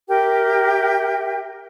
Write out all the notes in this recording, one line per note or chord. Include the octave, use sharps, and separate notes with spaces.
G4 A#4 E5 G5